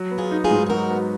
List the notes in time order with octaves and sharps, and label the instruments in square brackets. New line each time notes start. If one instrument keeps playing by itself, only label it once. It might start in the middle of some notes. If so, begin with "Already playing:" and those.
Already playing: [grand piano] F#3
B3
[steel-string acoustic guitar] F4 G#4
[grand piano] D#4
[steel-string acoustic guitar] F4 G#4
[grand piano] G#2
[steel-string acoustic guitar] G#4
[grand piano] F#3 [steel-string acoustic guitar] F#4 A#4
[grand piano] B3